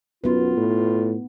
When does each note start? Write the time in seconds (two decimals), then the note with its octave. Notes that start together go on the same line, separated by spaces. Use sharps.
0.24 F#2 B3 D#4 F4 B4
0.57 A2